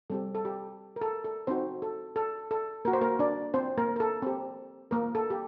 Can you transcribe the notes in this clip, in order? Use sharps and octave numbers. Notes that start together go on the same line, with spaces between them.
G3 C4 G4 A4
A4
G4
A#4
A4
A4
C4 D#4 F#4 C5
A4
A4
A4
A#3 F#4 A#4
C5
A#3 A#4
D4 D5
C4 C5
A#3 A#4
A#4
A4
C4 G4
A#3 A#4
A4
G4